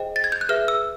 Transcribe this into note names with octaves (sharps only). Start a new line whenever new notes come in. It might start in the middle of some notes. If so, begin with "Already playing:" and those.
Already playing: G#4 C5 D#5 G5
A6
G#6
G6
F#6
G#4 B4 E5 F6
E6